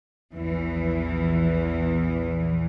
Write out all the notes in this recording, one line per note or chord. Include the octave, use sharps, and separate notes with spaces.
A#1 E2 E3